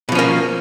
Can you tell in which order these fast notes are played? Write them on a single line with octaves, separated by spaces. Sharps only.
B2 F3 C#4 A#3